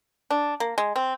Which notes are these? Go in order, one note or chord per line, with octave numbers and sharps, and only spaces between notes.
D4
A#3
G#3
C4